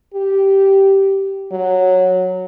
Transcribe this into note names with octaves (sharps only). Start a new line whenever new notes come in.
G4
F#3